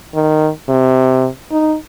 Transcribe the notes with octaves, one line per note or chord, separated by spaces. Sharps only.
D#3
C3
D#4